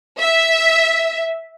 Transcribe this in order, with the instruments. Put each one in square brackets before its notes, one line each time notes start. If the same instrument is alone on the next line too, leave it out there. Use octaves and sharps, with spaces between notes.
[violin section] E5